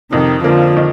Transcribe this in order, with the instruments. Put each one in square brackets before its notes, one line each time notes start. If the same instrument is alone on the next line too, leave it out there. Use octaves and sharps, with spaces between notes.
[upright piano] F2 [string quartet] C3 D#3
[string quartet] D3 F3 [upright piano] A#3
[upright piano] D#3